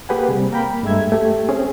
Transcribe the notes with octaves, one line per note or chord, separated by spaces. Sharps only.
A#3 G4 G#4 B4 F#5 G#5
C3 G3 C4
A#3 A#4 G5 B5
G2 G#3 A3 E5 G#6
A3 G4
C4 C#4 G#4